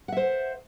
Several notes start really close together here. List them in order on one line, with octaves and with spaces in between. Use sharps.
F#5 E5 C5